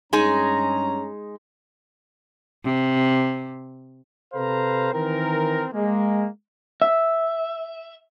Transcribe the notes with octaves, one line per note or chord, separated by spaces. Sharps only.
G2 G#3 C#4 D#4 G#4 A#5
C3
C3 A4 B4 C5 F5 A#5
D#3 E3 C4 A#4
G#3 A#3
E5